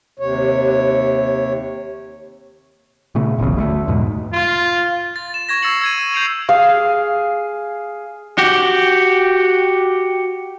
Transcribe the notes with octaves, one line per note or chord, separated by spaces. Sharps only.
D#2 C3 C#5
A#2 C#3 A3
F1 B1 E2 C#3
D2 G3 A3
E2 G#2 B2 G#3
F4
A6
E7
C#6 G#6 A#6
C#6 E6 A6 C7 C#7 F#7
E6 G#6 D#7
G6 G#6 C7 D7 F7 F#7
G#4 F5
F#4 G4